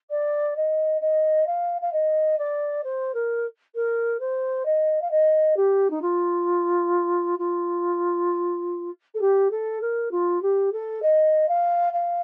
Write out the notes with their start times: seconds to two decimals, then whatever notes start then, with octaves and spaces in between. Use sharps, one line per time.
0.10 D5
0.56 D#5
1.01 D#5
1.47 F5
1.81 F5
1.93 D#5
2.38 D5
2.84 C5
3.14 A#4
3.75 A#4
4.20 C5
4.65 D#5
5.01 F5
5.11 D#5
5.56 G4
5.90 D#4
6.01 F4
7.39 F4
9.14 A4
9.21 G4
9.51 A4
9.81 A#4
10.11 F4
10.42 G4
10.72 A4
11.02 D#5
11.48 F5
11.93 F5